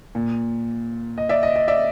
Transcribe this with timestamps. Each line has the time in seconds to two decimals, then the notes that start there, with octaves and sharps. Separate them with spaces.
0.15 A#2
1.18 D#5
1.29 D5 E5
1.43 D#5
1.56 D#5
1.68 D5 E5